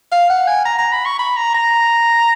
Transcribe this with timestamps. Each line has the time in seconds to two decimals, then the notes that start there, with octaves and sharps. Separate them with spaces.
0.12 F5
0.30 F#5
0.48 G#5
0.65 A#5
0.79 A#5
0.92 B5
1.06 C#6
1.19 B5
1.36 A#5
1.54 A#5